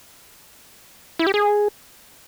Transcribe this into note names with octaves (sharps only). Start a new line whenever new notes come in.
E4
G4
G#4